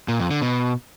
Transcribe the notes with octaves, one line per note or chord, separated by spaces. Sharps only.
A#2
F2
D3
B2